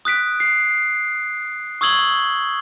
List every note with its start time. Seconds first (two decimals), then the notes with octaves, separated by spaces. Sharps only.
0.05 D#6 F#6 B6 D7
0.40 C7
1.81 C#6 D#6 E6 G#6 F#7 G7